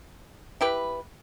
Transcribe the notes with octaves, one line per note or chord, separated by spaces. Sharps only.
E4 G4 B4